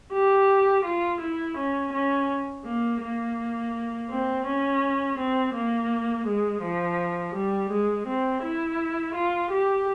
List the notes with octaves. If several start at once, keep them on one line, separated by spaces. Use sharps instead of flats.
G4
F4
E4
C#4
C#4
A#3
A#3
C4
C#4
C4
A#3
G#3
F3
G3
G#3
C4
E4
F4
G4